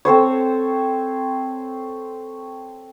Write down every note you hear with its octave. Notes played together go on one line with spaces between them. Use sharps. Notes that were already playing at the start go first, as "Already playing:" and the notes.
C4 A4 C5 C#5